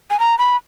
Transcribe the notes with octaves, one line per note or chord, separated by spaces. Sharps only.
G#5
A#5
B5